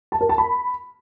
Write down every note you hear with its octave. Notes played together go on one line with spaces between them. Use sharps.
A5
A#4
A5
B5